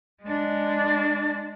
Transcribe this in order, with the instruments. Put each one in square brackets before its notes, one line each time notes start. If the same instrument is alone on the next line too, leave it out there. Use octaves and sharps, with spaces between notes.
[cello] G#3 D4